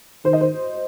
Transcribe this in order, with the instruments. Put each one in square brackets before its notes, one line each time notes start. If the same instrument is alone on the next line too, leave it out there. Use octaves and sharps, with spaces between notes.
[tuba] D#3 [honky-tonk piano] C5
[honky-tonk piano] D#5
C5